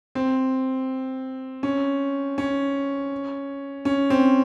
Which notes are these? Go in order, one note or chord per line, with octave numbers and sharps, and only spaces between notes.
C4
C#4
C#4
C#4
C4